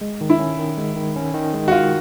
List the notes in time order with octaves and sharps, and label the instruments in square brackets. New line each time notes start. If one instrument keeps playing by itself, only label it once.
[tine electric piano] G#3
D#3
[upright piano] E4
[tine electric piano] C#4
D#3
G#3
D#3
C#4
D#3
G#3
[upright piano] F#4
[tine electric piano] D#3 [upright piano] F4